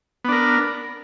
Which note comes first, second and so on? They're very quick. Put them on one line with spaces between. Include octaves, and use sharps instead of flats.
B3 D4 A#4